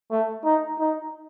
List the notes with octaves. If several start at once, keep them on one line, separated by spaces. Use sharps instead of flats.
A3
D#4
D#4